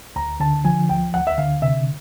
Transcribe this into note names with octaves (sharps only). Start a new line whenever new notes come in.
D2 A#5
D3 A5
F3 G#5
D2 G5
D2 F#5
E5
D3 F5
C3 E5